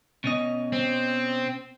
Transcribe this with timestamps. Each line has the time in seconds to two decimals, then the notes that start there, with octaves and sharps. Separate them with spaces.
0.24 B2 C#4 D#5
0.73 C4